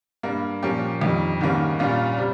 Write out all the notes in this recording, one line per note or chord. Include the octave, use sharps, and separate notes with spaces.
G2 G3 A#3
A#2 F3 A#3 C#4 G4
F2 D#3 G3
G#2 D#3 G3 A#3 C#4
A#2 G3 C#4 F4
C3 G3